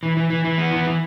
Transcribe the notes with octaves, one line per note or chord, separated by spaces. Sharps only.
E3
E3
E3
E3
B3
E3
E3